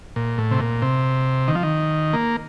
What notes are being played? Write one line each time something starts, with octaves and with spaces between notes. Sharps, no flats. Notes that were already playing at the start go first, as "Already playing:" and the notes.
A#2
A2
C3
A#2
C3
D#3
F3
D#3
A#3